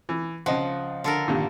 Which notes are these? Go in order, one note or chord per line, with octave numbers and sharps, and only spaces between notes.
E3
C#2 F3 D#5 F#5
D3 A4 A#4
G2 A#2 D#3